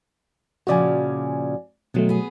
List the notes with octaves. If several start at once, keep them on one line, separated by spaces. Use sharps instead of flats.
A#2 C#3 F3 F#4 D5 G#5
B2 D#3 F#3 G#3 A3
B3 G#4